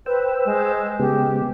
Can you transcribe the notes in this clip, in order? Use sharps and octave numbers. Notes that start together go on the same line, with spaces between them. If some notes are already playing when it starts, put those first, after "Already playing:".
B4 C5 G5 E6
G#3
C#3 G#3 B3 G4